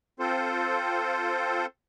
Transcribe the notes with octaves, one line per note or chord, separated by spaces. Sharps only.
C4 F4 A4 C5